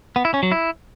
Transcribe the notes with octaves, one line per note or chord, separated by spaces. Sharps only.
B3
E4
C#4
F#3
E4